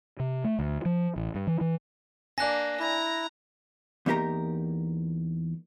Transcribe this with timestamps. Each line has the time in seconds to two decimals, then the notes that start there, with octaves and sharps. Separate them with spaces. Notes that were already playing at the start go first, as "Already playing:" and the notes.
0.19 C3
0.44 A3
0.59 D2
0.85 F3
1.16 A1
1.35 G2
1.47 E3
1.61 E3
2.38 A#3 D4 D5 G#5 F#6 A#6
2.80 E4 A#5
4.06 E2 A#3 D#4 G4 A#4 A#5